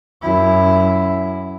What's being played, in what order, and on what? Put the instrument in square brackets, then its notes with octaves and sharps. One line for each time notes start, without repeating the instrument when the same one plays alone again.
[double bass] F#2 E4